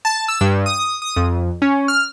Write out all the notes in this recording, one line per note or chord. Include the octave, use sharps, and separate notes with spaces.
A5
E6
G2
D#6
D#6
F2
C#4
F6